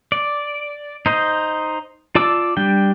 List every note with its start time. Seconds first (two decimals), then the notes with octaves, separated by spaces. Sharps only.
0.12 D5
1.06 D#4 C5 D#5
2.15 F4 D5 A5 D6 E6
2.57 G3 D4 G5